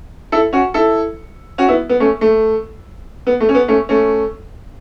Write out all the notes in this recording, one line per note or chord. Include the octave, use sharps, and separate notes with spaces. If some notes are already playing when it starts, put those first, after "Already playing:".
E4 A4
C#4 F#4
E4 A4
C#4 F#4
B3 E4
B3
A3 C#4
A3
B3
A3
C#4
B3
A3 C#4
A3 C#4